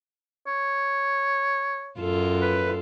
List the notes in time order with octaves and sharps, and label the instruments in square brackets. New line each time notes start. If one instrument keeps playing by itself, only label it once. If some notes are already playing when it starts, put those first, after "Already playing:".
[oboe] C#5
[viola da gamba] F#2 F4 A4
[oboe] B4